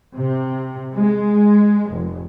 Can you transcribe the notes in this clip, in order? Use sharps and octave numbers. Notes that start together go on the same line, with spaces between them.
C3
G#3
F1